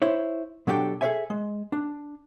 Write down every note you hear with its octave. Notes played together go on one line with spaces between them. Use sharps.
E4 C5 C#5
B2 F#3 D4 G4 A4 G5
G#4 A4 B4 C#5 E5 G#5
G#3
D4